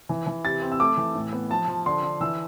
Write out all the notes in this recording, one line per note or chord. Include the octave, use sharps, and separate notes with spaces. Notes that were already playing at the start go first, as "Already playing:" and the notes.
E3
E3
C3 A6
C4
E6
A3 D6
E3
A2
B3
F3 A5
F3
D3 C6
D3
E3 E6